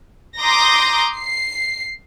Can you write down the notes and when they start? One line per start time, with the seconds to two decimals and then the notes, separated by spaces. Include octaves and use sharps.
0.40 A#5 C6 D6 D#6 G6 A#6
1.17 C7